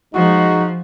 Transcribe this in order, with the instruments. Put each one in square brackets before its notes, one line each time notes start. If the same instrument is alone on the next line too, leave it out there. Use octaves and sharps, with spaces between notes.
[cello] F3 [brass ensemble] G#3 D#4 [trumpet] F#4